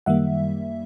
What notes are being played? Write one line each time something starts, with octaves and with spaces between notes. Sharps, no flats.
F#2 D#3 G3 A#3 E5 F#5